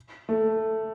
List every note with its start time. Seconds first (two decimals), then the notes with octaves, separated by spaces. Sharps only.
0.29 A3